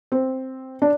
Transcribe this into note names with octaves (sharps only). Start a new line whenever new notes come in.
C4
D4